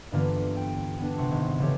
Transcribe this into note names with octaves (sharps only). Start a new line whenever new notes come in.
G2 D3 E3 A#3 B3 F4
G5
B3 D4
C3 F#5 C6 C#6
G#1
C#3 E3 A3 G4 A4 C#5